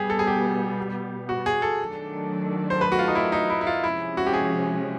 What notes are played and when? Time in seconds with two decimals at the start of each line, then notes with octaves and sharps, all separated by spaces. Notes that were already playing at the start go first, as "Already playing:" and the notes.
Already playing: B2 G3 B3 G4 G#4
0.10 A4
0.19 G#4
0.27 G4
1.29 F#4
1.46 G#4
1.62 A4
1.80 D#3 F#3 A3 D4
2.70 C5
2.81 B4
2.92 F#4
2.99 F4
3.08 D#4
3.15 E4
3.32 D#4
3.50 E4
3.61 E4
3.67 F4
3.84 C3 F3 G#3 C#4 E4
4.17 F#4
4.26 G4
4.33 G#4